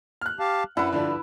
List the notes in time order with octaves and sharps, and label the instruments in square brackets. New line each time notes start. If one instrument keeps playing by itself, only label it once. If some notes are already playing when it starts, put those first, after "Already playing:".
[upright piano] F6 F#6
[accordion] G4 F5 A5
[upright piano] F#2 D4 [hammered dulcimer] E4 B4 [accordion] F#5
[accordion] G2 [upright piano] D3 F3 D4